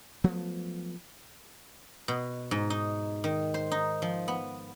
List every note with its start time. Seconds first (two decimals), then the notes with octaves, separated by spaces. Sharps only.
0.24 F3 F#3 A3 B3
2.08 B2
2.51 G#2
2.70 D#4
3.24 D#3
3.54 C5
3.71 D#4
4.02 F3
4.28 B3